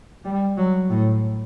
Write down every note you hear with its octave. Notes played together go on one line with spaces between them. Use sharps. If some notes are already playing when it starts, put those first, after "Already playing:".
G3
F#3
A2